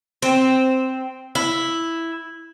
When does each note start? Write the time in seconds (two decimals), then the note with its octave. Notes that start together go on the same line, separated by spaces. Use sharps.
0.22 C4
1.35 E4